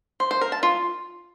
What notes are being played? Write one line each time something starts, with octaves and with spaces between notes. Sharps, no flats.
C5
C5
A#4
A5
F4